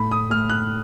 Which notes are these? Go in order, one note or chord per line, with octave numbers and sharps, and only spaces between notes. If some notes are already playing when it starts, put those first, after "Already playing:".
Already playing: A2 A3 B5
D#6
A3 F6
F#6